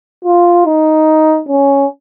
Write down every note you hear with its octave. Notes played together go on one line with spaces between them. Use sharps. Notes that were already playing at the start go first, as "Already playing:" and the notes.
F4
D#4
C#4